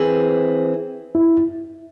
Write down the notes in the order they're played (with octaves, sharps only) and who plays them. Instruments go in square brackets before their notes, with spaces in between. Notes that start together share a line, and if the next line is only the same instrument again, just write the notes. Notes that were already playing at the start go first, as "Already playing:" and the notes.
Already playing: [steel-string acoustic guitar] E3 C4 E4 G#4
[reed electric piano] E4